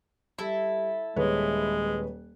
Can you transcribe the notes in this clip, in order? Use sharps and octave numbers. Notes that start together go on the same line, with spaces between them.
G3 E4 A4
D#1 G#3 B4 C#5